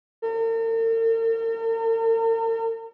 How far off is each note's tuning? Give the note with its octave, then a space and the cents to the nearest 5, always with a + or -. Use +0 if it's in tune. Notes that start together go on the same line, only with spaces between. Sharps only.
A#4 -45